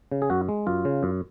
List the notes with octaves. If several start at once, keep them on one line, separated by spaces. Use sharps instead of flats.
C#3
G#4
F#2 F#4
G#3
F#2 F4
C#3
F#2